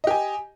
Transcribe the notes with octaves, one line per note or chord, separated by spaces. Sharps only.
G4 D#5 G#5